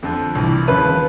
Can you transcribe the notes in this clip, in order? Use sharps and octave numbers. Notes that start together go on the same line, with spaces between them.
F2 D3 F3
C2 C3 E3
D#2 C#3 F3 B4